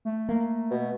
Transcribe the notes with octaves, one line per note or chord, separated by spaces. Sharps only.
A3
A#3
B2